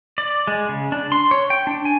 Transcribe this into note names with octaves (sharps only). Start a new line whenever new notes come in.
D5
G#3
C#3
D4
C6
C#5
G5
D4
G#5